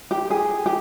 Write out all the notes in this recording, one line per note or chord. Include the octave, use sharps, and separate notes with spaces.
G4
G#4
G4